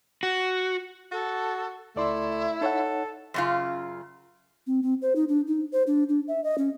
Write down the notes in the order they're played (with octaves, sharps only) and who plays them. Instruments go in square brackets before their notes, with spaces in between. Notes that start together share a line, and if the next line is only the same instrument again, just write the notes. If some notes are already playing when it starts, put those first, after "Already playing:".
[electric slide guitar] F#4
[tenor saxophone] F#4 [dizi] A4
[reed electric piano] C#2 D5 C6 [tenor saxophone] A3 [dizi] E4
[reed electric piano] D#4 C#5 F#5 [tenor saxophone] A4
[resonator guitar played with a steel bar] F#2 C#3 F4
[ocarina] C4
C4
C5
D#4
D4
D#4
C5
D4
D4
E5
D#5
C#4